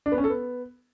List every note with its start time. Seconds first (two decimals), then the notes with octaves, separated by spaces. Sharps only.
0.06 D4
0.12 B3
0.18 C#4
0.24 A4
0.30 B3